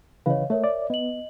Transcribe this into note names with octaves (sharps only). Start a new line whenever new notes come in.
C#3 E3 B4 C#5 D#5 F5
A3 A#4 C#5 E5
D5
B3 D#5 F#7